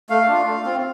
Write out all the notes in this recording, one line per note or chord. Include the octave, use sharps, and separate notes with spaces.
A3 F5
D4 F4
A3
C4 F4